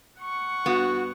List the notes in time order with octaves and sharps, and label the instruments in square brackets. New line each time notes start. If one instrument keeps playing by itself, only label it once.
[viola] F#5 C#6
[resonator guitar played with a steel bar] G2 B3 [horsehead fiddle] F#4